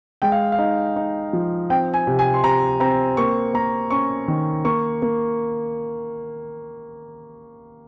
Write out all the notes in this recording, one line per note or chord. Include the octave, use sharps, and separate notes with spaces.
G#3 G5
F5
F5
D#4
D#4
F3
C4 G5
G#5
C3
G#5
C6
C3 A#5
C4 A#5
A#3 C#6
A#3 A#5
C#4 C#6
D#3
A#3 C#6
A#3